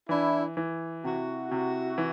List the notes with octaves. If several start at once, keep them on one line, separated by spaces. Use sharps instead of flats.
E3 D4 E4
E3
C3 E4 F#4
C3
E3